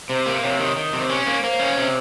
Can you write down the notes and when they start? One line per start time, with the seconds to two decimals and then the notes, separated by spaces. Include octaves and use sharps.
0.09 C3 C5
0.26 A#3
0.43 C3 C#5
0.60 D#3
0.76 D#3
0.93 C3
0.98 C5
1.10 C#4
1.21 C#5
1.27 A#3
1.43 A#3 C5
1.59 C#4
1.77 C3